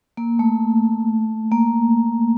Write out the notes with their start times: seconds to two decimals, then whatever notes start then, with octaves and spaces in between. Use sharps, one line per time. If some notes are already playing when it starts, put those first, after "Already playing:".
0.17 A#3
0.39 A3
1.52 A#3